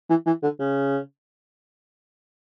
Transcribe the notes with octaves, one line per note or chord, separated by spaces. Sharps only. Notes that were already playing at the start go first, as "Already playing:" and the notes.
E3
E3
D3
C#3